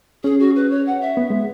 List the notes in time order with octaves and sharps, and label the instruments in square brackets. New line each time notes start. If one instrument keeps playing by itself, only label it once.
[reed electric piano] C#4 [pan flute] G#4
[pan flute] F#4
B4
C#5
F#5
E5
[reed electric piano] B3
G#3